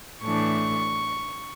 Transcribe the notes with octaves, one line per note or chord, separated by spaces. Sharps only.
A2 E3 A3 D4 C#6